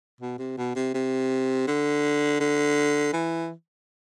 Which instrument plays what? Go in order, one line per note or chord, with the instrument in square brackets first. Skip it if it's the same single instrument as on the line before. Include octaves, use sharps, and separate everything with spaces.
[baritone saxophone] B2
C3
B2
C3
C3
D3
D3
E3